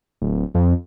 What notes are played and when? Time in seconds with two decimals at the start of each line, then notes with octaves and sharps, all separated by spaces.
0.22 D1
0.55 F2